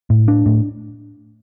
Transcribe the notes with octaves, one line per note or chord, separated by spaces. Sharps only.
A2
D4
A2